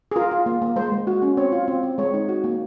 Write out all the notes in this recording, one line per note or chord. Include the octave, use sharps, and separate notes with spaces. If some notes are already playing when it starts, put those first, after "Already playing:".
G#4
F4 A#4
F4
A#3
A#3
G#3 C5
G#3
F#4
C#4
C4 C#5
F4
C4
C4
G#3 C#5
D#4
F#4
A#3